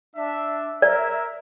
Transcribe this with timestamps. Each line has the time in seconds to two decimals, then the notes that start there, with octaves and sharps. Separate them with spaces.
0.16 D4 E5
0.82 A#4 D5 E5